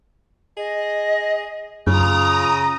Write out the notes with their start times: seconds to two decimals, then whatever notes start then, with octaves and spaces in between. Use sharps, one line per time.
0.57 G#4 D#5
1.87 F#2 C#3 F4 A#5 D#6